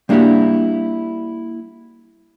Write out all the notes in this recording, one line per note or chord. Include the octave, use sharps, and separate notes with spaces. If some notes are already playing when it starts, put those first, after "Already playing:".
G3 A#3 D4 E4 F#4 G4